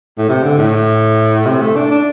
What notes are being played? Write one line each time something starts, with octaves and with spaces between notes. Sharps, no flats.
A2
C3
D3
A2
C3
A3
D4
D4